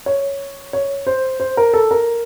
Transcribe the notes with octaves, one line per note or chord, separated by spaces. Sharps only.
C#5
C#5
C5
C5
A#4
A4
A#4